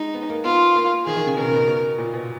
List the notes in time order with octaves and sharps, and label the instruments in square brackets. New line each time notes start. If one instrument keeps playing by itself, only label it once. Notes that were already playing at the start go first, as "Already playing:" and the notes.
Already playing: [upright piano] G#3 [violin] D#4
[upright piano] B3
A#3
[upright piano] B3 [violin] F4
[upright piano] A#3
[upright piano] D#3 [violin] G#4
[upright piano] D#3
C#3
[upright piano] B2 [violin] A#4
[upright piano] C#3
B2
B2
A#2
B2